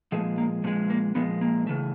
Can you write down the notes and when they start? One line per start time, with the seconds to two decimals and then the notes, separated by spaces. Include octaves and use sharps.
0.12 A#2 F3 G#3 A3
0.38 A#3
0.64 A#2 F3 G#3 A3
0.90 A#3
1.15 A#2 F3 G#3 B3
1.41 A#3
1.67 C#3 E3 A3